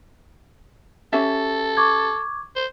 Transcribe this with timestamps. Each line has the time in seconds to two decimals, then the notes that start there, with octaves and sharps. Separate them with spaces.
1.13 C#4 G4 A4 E5
1.77 C#6 D6 G#6
2.56 C5